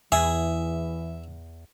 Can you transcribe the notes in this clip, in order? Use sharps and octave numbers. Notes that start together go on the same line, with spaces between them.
E2 E3 G#4 E5